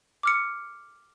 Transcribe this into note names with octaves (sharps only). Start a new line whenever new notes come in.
D6 F6 C#7